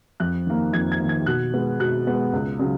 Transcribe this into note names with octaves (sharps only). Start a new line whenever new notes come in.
F2 F#6
D#3 A#3
F2 G#6
G#6
D#3 A#3
G#6
B2 F#6
G#3 B3
B2 F#6
G#3 B3
C#2
C#3 F#3